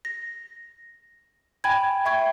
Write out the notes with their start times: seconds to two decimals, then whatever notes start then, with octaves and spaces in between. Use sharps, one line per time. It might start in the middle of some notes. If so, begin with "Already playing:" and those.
0.05 A#6
1.64 G5 G#5 B5 G#6
2.05 E5 G5 C#6 G#6